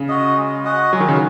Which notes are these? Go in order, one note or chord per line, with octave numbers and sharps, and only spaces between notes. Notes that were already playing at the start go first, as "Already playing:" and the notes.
Already playing: C#3
F#4 D#5
G#3
F#4 D#5 F#5
F#3 G#3
D#3
C#3